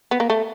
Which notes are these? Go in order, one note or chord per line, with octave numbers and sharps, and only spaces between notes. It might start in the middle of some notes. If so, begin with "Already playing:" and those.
B3
A#3
A3